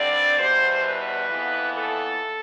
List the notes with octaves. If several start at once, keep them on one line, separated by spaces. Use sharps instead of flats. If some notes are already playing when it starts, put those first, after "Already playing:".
Already playing: G2 D3 G3 C4 D5
E2 B2 G3 C5
B4
F2 E3 B3
A4